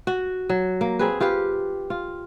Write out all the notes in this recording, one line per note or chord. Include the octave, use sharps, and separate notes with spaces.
F#4
F#3
A#3
C4 G#4 B4
F4 G4 B4 F5
F4